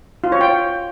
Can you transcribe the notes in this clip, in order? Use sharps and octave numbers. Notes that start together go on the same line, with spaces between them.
F4
C#5
G5